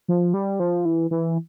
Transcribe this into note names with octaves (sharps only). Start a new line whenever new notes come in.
F3
G3
F3
E3
E3